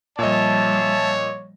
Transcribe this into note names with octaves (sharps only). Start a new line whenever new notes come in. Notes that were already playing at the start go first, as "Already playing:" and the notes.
A#2 F3 G3 C#5 D#5 E5 A5